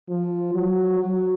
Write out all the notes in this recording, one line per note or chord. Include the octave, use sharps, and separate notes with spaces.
F3
F#3
F#3